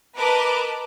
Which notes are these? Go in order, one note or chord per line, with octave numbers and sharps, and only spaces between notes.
A#4 B4 D#5 A5 D6